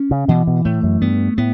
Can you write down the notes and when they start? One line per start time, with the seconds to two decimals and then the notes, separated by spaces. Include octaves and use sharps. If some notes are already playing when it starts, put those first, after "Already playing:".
Already playing: C#4
0.11 C#3
0.28 B2 E3
0.47 B2
0.65 A2 A3
0.83 F#2
1.02 G2 B3
1.38 A2 B3